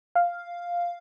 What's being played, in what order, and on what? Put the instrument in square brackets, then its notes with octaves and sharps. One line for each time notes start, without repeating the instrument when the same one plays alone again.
[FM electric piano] F5